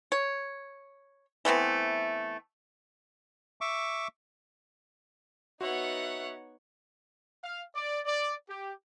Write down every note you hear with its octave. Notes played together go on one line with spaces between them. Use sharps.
C#5
E3 A3 B3 C4
E5 C#6 D6
B3 D#4 F#4 C#5 E5 F#5
F5
D5
D5
G4